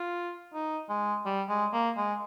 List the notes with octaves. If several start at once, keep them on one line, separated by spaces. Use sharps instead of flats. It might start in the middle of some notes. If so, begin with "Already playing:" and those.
Already playing: F4
D#4
G#3
G3
G#3
A#3
G#3